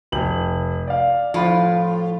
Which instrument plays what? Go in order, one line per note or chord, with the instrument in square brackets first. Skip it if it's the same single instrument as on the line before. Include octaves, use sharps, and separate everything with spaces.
[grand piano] F1 F#7
D5 F5
[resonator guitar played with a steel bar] A2 F4 [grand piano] F3 B5